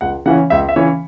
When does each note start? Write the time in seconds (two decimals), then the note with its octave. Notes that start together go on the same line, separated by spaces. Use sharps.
0.01 C#2 F#5
0.26 C#3 E3 C#4 F#5
0.50 C#2 E5
0.69 E5
0.76 C#3 E3 C#4 C#5